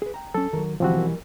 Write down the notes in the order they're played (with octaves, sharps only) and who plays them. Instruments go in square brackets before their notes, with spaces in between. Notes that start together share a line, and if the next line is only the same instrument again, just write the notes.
[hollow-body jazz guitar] G#4 B4
G5 A#5
[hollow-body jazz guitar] F#3 C#4 [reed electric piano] A4
[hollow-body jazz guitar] D#3 F#3 [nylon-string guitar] A#4
[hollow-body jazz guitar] D2 [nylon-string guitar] B2 E3 G3 [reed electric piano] F3 C4 F#4
[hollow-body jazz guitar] A#4